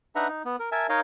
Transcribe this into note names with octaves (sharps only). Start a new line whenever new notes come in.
D4 D#4 B4 E5 F#5 A#5
D#4
B3
A#4
A#4 E5 G#5 A5
D#4 A#4 C#5 D#5 F5